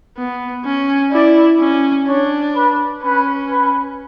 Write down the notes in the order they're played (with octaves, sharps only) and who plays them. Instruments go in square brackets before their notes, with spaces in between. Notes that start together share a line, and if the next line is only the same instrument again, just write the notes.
[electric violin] B3
C#4
[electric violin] E4 [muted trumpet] D5
[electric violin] C#4
[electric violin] D4 [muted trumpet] C#5
[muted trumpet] B4
[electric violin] C#4 [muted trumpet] B4
[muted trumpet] B4